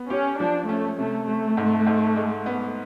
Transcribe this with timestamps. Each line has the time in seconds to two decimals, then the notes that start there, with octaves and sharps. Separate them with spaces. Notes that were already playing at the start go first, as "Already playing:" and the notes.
Already playing: B3
0.10 C#4 G4
0.39 F3 D4
0.69 A3 C#4
0.98 C3 A3
1.28 C3 A3
1.57 G#2
1.86 G#2
2.16 G#3
2.46 B3